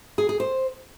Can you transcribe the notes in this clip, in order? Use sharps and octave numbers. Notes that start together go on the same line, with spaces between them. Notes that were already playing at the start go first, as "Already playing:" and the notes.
G#4
G#4
C5